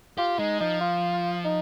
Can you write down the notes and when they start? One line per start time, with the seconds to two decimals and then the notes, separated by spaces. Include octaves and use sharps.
0.18 F4 G4
0.39 G#3 D#4
0.60 F3 D#4
0.81 F4
1.44 D#4